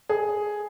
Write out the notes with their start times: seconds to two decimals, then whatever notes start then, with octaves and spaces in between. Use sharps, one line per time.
0.09 G#4